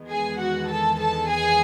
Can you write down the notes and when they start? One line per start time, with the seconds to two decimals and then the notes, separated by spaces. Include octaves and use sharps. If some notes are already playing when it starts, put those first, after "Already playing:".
Already playing: E2 D#3 G#3 B3
0.10 G#4 G#5
0.40 F#4 F#5
0.70 A4 A5
1.00 A4 A5
1.30 G#4 G#5